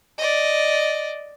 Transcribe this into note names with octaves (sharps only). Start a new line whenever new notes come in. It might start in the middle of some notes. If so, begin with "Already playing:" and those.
D5 D#5